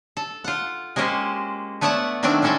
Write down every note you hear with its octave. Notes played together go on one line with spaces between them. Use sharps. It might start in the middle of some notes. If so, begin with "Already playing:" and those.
A4
F4 F#5
G#3 A#3 C#4 G4 C5
A3 B3 C#5 D5 F#5 A5
D#3 F#3 A3 C4 D4 D5
G3 G#3 C#4 A4 C#5 D5